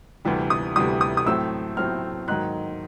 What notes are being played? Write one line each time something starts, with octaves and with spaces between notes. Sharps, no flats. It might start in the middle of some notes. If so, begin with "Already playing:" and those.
D2 C3 E3 G3
D#6
D2 C3 E3 G3 D#6
D#6
D#6
A2 F#3 A3 C4 E6
A2 F#3 A3 C4 F6
G#2 D#3 F#3 F#6